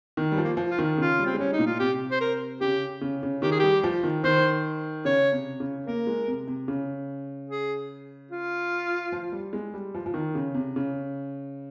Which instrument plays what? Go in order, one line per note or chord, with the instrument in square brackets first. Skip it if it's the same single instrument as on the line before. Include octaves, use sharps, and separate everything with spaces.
[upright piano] D#3
G3
F3
[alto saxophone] A#3
[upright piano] F3
[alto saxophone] F4
[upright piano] D#3
[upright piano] C#3 [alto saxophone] F4
[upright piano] G3
[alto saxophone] C4
[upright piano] G#3
[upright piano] G3 [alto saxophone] C#4
[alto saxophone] D#4
[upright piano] A#2
[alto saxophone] F4
[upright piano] C3 [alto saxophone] G4
[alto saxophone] C5
A#4
[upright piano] C#3 [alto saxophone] G4
[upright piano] C#3
C#3
[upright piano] D#3 [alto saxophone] G4
[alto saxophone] G#4
[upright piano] G3 [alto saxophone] G4
[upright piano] F3
D#3
[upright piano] D#3 [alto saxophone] C5
[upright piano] C#3 [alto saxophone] C#5
[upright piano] C3
C#3
[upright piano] A#3 [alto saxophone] A#4
[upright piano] G#3
C3
C3
C#3
[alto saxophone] G#4
F4
[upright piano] F3
G3
G#3
G3
F3
F3
D#3
C#3
C3
C#3